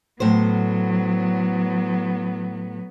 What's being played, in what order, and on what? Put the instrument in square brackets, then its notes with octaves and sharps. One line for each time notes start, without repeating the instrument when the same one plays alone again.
[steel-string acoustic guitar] A2 C5 [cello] F#3 B3